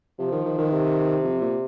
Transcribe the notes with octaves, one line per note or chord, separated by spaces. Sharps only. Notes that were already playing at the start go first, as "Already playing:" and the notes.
C3 F3
D#3
D#3
D#3
C3
F2
A#2